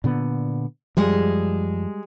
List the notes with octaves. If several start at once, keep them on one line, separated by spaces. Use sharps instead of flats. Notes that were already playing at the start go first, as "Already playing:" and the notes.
A#2 D3 B3
F#2 F3 G3 G#3